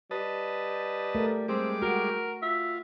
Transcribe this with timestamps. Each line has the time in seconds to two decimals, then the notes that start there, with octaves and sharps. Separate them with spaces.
0.11 G3 B4 D#5 A5
1.15 A3 A#4
1.48 G3 G#3 C4 D6
1.82 F#4 A#4
2.42 F4 E5